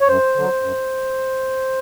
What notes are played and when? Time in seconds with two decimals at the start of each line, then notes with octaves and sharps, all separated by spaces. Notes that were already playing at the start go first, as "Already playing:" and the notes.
0.01 C#5
0.08 F#2 C5
0.35 D3 F#3
0.62 F#2